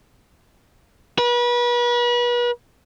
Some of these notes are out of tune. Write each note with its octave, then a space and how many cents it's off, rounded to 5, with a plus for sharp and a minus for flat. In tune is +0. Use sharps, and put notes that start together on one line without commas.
B4 -35